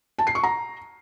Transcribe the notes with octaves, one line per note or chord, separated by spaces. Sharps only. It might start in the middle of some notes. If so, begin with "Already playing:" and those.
A5
C7
C#6
A#5